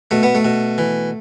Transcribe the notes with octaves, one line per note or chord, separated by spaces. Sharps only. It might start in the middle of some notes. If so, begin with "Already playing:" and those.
B2 A3
B3
A3
B2
E3